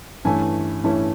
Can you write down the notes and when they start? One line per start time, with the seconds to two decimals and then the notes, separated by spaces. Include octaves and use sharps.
0.25 G2 E3 A3 C#4 E4 G#5
0.84 G2 E3 A3 C#4 E4